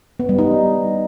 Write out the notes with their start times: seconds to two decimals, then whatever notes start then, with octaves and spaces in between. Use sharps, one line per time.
0.20 B3
0.29 G3
0.39 D#4